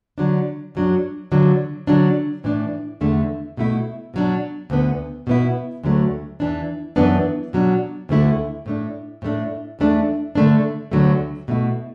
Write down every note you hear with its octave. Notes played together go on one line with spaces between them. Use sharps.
D3 F#3 D4
F#2 F#3 D4
D3 F#3 D4
D3 F#3 D4
A2 E3 D4
E2 D3 A3 D4
B2 A3 E4
B2 F#3 D4
D2 D3 B3
B2 B3 E4
D2 D3 F#3 A3
E2 E3 D4
F#2 E3 B3 D4
B2 F#3 D4
D2 D3 A3 E4
A2 A3 D4
A2 A3 D4
E2 E3 A3 D4
D3 A3 D4
D2 D3 F#3 A3
B2 A3 E4